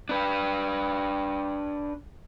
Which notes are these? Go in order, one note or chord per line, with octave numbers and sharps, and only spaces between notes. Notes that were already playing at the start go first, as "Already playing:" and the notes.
D4 B4